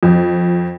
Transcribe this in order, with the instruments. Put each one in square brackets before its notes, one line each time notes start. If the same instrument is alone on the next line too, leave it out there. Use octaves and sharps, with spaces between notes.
[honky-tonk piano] F2